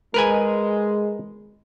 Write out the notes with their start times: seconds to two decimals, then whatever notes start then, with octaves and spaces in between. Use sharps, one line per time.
0.14 G#3 A#4 B4 G#5